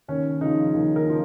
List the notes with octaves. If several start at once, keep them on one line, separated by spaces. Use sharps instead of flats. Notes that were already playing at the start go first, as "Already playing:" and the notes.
D#2 C#4
C#3 F3 D#4
D#2
A#4
C#3 F3